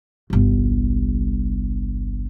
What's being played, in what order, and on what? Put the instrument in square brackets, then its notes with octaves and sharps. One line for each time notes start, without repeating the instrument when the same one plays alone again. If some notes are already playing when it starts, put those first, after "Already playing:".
[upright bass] G1 C2